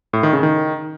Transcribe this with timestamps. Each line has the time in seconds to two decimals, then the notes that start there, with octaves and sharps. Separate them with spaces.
0.13 A2
0.23 D#3
0.33 C#3
0.43 D#3